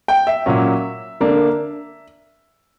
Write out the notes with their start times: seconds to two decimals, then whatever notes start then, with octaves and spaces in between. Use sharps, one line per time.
0.08 G5
0.27 E5
0.46 A#2 F#3 C#4
1.20 D3 A#3 D4